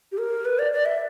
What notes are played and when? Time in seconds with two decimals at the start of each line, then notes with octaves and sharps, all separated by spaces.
0.12 G4
0.18 A#4
0.45 B4
0.59 D5
0.73 D5
0.86 E5